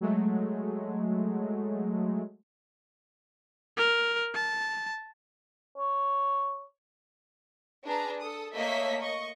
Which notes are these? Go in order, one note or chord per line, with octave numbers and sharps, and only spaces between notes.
F#3 G#3 A3
A#4
A5
C#5
D4 G#4 B4 A#5
A4 D#6
A3 A#3 C#5 D#5 E5 B6
D#5 C#6